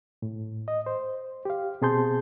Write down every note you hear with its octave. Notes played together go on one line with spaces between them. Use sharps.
A2
D#5
C5
G4 F5
B2 C4 G#4 A5 C6 G6